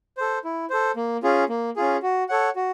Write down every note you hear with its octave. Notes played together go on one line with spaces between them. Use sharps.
A4 C5
E4
A4 C5
A#3
C#4 F4 G#4
A#3
C#4 F4 G#4
F#4
A4 C#5 F#5
F#4